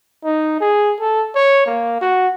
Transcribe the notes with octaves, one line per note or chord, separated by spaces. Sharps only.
D#4
G#4
A4
C#5
A#3
F#4